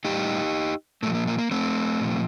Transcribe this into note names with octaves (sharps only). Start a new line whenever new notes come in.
A2 G3 D#4 G4
A#2 F3 A3
A#3
A#3
A#3
A3 C4
A#2 F3